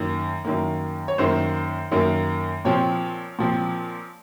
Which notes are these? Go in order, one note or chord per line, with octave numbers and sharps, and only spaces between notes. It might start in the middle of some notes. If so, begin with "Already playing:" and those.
Already playing: F#2 D#3 A#3
F#2 D#3 A#3
C#5
F#2 D#3 A#3 C5
F#2 D#3 A#3
A#2 F3 C4 C#5
A#2 F3 C4